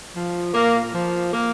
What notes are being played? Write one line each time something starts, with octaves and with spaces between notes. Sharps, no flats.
F3
A#2 A#3
F3
A#3